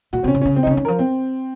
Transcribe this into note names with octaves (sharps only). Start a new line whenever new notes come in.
A#2 F#4
C3 C4
C#4
C3
C#3 C#4
C4
D#4
C#3 C#4
D#3
F3 A#4
C4